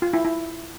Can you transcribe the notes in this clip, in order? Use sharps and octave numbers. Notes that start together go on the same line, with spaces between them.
F4
E4
E4